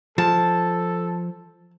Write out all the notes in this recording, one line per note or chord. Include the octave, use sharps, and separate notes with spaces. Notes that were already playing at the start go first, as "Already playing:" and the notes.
F3 A4 A5